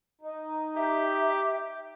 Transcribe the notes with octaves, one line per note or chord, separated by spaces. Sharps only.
D#4
G4 E5